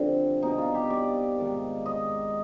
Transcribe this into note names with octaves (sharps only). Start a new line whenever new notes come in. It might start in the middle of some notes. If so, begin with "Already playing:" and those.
Already playing: G2 D3 F3 C4
B2 D#4
F4
G4
D5
G#2 D#3
D#5